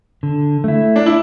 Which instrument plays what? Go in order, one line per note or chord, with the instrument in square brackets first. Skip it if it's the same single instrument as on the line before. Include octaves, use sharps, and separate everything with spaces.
[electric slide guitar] D3
A3 E4
[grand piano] D4
E4